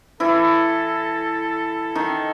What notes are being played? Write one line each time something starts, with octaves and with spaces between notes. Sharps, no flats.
E3 E4 A4
D#3 D#4